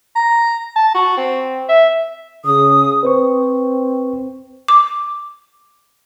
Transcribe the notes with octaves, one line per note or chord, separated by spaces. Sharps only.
A#5
A5
F#4
C4
E5
C#3 D#6
C4 B4 C5 C#6
D6